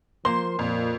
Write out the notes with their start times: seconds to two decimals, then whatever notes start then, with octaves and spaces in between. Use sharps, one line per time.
0.25 F3 A#3 C5 C6
0.59 F2 A#2